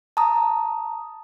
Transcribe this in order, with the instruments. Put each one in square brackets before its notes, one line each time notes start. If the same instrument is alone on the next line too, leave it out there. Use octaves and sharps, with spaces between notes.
[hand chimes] A5 A#5 D#6